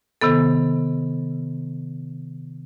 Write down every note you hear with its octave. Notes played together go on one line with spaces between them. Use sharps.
C3 D#3 B3 A4